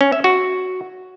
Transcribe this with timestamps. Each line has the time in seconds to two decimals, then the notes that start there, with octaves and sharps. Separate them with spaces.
0.01 C#4
0.12 E5
0.24 F#4